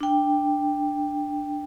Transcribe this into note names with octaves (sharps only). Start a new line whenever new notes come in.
D4 G5